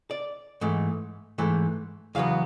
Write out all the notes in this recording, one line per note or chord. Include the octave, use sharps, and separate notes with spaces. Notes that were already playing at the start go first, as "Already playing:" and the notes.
D5
G#2 E3 A3
G#2 E3 A3
E2 C#3 F#3 B3 F5